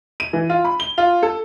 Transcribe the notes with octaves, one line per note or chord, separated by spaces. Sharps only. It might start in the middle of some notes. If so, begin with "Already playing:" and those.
D#7
E3
F4
B5
G7
F4
A4